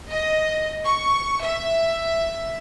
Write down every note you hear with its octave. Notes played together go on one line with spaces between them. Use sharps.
D#5
C#6
E5